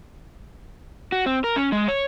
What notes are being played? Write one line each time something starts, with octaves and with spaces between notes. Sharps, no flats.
F#4
C4
A#4
C#4
G#3
C#5